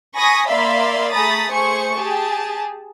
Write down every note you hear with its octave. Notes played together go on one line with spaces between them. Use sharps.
G#5 B5 C#6 D#6 A#6
A#3 D5 E5 F5 B5 C6
A3 G#4 A#5 B5 D#6 A6
A3 G#4 C5 G#5 C#6 C#7
G4 G#4 A5